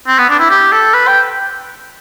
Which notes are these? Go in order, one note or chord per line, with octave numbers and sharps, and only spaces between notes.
C4
B3
D4
E4
G4
A4
B4
G5